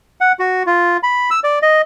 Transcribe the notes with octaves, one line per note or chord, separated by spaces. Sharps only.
F#5
F#4
F4
B5
E6
D5
D#5